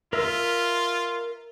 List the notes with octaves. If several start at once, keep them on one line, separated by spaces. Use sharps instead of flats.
F4 A#4 E5 E6